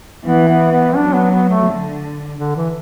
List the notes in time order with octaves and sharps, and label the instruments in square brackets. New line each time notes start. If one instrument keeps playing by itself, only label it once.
[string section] E3 [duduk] B3
[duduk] B3
B3
[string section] F#3 [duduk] D4
[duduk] B3
B3
A3
[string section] D3
[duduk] D3
E3